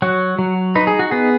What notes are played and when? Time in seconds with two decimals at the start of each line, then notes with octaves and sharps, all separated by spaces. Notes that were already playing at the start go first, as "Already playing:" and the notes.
0.02 F#3 F#4
0.39 F#3
0.75 D#4 B4
0.87 G#4
0.99 F#4
1.11 B3 G#4